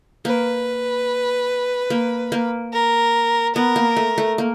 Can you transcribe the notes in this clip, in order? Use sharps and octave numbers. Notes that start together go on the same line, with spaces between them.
A#3 B4
A#3
A#3
A#4
B3 A#4
A#3
A3
A3
A#3